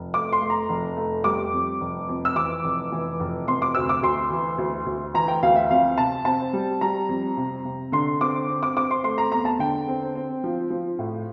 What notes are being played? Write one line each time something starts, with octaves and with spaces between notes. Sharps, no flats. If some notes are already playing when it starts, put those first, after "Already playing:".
Already playing: F1
A3 D6
C6
A3
A#5
F1
A3
G3 D6
F2
F1
F2
E6
E3 D6
F1
E3
F1
C3 C6
D6
D2 E6
D6
D2 C6
E3
D2
D2
E3 A#5
G5
D2 F5
E5
F2 F5
C3 A5
C4 A5
G3
G3 A#5
F2
C3
C3
D3 C6
C4 D6
C4
D6
C4 D6
C6
A3 C6
A#5
E2 A#5
A5
D3 G5
C4
C4
F3
F3
A2